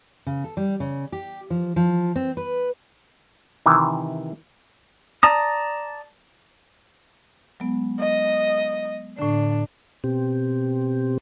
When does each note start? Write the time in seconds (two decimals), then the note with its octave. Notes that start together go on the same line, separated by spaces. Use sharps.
0.27 C#3
0.44 A4
0.57 G3
0.80 C#3
1.12 G4
1.50 F3
1.76 F3
2.16 C4
2.37 B4
3.66 C3 D#3 E3
5.23 D5 A5 A#5 D#6
7.60 F#3 G#3 B3
8.00 D#5
9.19 A2 D3 D4
10.04 B2 C4 G4